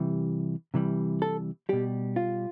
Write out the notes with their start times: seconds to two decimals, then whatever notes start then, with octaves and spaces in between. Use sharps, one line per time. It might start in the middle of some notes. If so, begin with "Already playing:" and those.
Already playing: C3 E3 G3
0.74 C3 E3 G3
1.22 A4
1.69 B2 G3 G4
2.16 F4